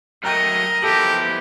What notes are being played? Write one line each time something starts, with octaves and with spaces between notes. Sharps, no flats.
F#3 A3 A#4 D#5 G5 A#5 F6
F3 B3 E4 G4 A4